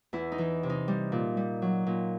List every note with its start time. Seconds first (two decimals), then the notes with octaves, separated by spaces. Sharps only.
0.13 E2 E4
0.32 D#4
0.38 E3
0.63 C3
0.70 D#4
0.88 G3
1.12 A#2
1.37 G3
1.62 F#3
1.86 A#2